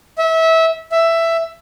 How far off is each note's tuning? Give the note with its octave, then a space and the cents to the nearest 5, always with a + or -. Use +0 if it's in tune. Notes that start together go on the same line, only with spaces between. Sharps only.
E5 -25
E5 +10